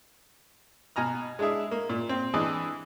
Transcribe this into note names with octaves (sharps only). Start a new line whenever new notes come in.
B2 G#5 A#5 F6
G#3 D4 E4 G#4 E5
A#3
A#2
C4
E3 D4 G#4 D5 D#5